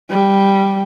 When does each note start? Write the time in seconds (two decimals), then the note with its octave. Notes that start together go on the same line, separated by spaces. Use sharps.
0.11 G3